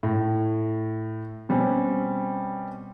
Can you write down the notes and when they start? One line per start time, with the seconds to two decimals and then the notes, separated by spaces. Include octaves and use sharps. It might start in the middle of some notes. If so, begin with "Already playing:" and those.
0.03 A2
1.49 B2 G3 C4 C#4